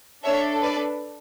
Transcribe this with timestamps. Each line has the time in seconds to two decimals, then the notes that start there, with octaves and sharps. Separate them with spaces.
0.24 D4 A4 C#5 E5
0.61 B4 D5